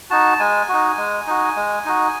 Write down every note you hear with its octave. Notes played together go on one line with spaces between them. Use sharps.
D#4 F#4 A5
G#3 G#5
D#4 F#4
G#3
D#4 F#4
G#3
D#4 F#4